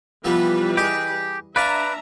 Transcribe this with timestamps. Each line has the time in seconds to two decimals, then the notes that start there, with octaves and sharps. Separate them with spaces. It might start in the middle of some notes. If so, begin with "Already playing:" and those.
0.24 C3 E3 F3 G3 B3 B4
0.77 G4 G#4 D#5
1.56 D4 B4 D5 E5 F5 A#5 C#6